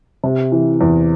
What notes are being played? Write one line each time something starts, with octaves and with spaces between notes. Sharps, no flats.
C3
E3
E2